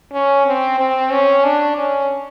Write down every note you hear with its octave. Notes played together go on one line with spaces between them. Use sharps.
C#4
C4
C4
C#4
D4
C#4